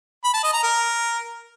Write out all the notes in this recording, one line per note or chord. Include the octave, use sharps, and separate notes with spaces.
B5
A5
D#5
A#5
A#4